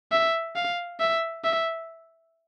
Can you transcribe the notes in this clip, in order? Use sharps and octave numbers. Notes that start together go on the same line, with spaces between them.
E5
F5
E5
E5